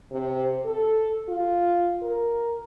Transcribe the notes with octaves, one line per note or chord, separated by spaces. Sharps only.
C3
A4
F4
A#4